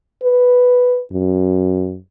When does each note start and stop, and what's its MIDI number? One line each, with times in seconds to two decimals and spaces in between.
0.23 1.01 71
1.12 1.98 42